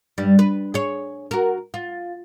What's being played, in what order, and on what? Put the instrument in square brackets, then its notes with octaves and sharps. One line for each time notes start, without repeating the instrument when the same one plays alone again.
[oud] G2 G3
B4
G#4 C#5
F#4 A#4
F4